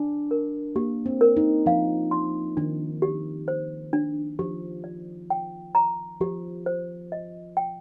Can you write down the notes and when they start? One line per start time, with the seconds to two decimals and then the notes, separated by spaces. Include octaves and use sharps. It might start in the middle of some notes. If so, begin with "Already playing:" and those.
Already playing: D4 G#5
0.31 A#4
0.76 A#3 G4
1.06 C4
1.21 A#4
1.37 D#4
1.66 F3 F5
2.11 C6
2.57 D#3 D4
3.02 G4
3.48 C5
3.93 D4
4.39 F3 G4
4.84 D5
5.30 G5
5.75 A#5
6.21 F3 G4
6.66 C5
7.12 D#5
7.57 G5